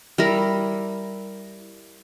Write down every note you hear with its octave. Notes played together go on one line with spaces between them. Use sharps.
G3 E4 A#4